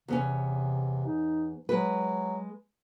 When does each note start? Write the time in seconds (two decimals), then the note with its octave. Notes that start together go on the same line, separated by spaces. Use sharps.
0.08 E2 C3 B3 C#4
1.06 D#4
1.69 F#3 G#3 B4